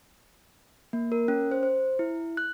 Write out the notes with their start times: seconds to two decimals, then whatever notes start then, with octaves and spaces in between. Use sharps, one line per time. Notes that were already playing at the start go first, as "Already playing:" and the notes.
0.93 A#3
1.12 A#4
1.28 C#4
1.51 C5
1.63 C5
1.99 E4
2.37 F#6